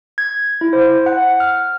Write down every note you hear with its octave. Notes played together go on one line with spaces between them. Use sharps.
G#6
E4
C5
F#5
F6